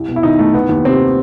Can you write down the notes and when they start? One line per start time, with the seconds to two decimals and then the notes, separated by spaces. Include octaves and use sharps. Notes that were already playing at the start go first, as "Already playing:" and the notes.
Already playing: C2
0.08 B2
0.16 E4
0.23 B2 D#3 D#4
0.39 C2 A3
0.54 D#3 B3
0.69 D#2
0.85 C3 D#3 C4